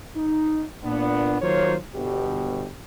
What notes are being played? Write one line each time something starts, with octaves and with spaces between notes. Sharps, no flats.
D#4
A#2 B3 D4
D#3 F#3 A#3 F4 C5 C#5
G1 B2 G4